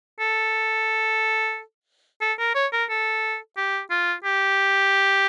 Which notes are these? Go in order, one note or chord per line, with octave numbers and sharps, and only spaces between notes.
A4
A4
A#4
C#5
A#4
A4
G4
F4
G4